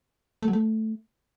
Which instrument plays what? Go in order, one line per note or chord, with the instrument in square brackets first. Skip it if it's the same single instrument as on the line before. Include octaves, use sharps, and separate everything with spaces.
[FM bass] A3
F#3
A3